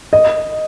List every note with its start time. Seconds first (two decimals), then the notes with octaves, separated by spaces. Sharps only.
0.13 D#5